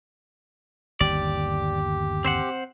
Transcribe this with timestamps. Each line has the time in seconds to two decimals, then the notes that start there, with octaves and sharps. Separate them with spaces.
1.01 G1 D#2 G4 D5
2.25 C4 C5 F#5